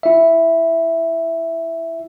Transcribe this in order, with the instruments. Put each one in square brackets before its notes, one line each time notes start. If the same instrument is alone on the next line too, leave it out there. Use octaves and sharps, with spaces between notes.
[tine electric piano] E4 E5